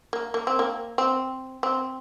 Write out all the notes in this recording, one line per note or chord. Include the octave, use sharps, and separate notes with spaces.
A#3
A#3
C4
A#3
C4
C4